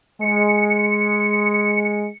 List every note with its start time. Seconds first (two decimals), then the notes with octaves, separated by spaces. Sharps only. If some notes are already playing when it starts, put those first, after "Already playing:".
0.21 G#3 C#7